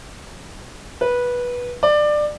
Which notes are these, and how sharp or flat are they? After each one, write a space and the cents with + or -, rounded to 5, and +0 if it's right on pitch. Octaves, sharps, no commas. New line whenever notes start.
B4 -15
D5 +20